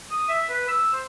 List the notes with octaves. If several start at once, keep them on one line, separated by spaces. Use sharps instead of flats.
D#6
E5
B4
E6
C5